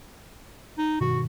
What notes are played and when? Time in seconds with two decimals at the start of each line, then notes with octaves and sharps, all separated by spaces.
0.78 D#4
1.01 G2 B2 D#3 F#4